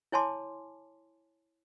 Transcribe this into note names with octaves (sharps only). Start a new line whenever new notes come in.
E4 C#5 G#5 A5 C6 D6